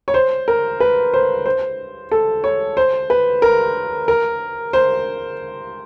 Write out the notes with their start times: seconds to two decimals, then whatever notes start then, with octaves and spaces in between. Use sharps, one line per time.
0.08 C#5
0.14 C5
0.48 A#4
0.80 B4
1.14 C5
1.46 C5
2.12 A4
2.44 C#5
2.77 C5
3.10 B4
3.42 A#4
4.08 A#4
4.73 C5